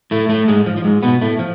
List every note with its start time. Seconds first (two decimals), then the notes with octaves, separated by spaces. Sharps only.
0.11 A2 A3
0.29 A2 A3
0.48 G#2 G#3
0.66 F3
0.77 F3
0.85 G#2 G#3
1.03 B2 B3
1.21 A2 A3
1.39 F3